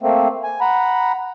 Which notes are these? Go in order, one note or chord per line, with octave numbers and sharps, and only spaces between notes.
A3 A#3 C4
G#5
F#5 A#5 B5